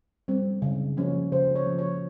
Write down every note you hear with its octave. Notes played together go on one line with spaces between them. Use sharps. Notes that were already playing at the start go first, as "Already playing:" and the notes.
G3 C4
C#3
F3 A#3 C#4
C#3 C5
C#5
F3 A#3 C#4
C#5